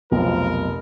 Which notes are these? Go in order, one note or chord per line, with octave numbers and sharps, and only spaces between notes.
F1 B1 F3 A#4